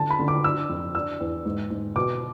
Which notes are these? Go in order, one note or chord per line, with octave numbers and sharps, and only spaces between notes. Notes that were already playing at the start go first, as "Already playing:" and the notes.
Already playing: D3 A5
B5
D3
D6
D4 E6
F2
D4 E6
E2
G#2
G#2
B2 D6